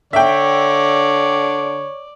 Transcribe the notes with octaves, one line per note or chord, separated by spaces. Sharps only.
D3 C#5 D5 E5 G5